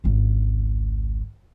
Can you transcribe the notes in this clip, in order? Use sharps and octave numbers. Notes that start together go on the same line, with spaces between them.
G#1 C#2